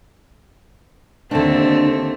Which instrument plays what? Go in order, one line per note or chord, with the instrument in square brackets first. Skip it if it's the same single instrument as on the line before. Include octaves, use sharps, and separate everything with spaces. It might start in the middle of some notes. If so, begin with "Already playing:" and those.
[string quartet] D#2 A3 C4 [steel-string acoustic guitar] D3 D4